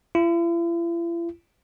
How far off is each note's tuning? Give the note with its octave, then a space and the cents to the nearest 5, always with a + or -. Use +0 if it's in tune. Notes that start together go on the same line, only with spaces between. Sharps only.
E4 +45